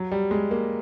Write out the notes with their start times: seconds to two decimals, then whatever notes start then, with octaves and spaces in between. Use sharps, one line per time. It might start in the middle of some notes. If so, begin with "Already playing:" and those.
Already playing: F#3
0.11 G3
0.31 G#3
0.51 A#3